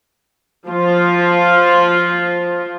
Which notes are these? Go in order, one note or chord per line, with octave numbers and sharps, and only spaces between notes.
F3 F4